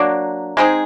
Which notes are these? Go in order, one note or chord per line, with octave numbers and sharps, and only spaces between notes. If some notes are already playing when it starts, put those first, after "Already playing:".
Already playing: F#3 A#3 D4
G#3 C4 D#4 G#4